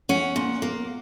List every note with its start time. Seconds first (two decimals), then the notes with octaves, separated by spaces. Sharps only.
0.09 C#4 F#5
0.36 A#2
0.62 A#3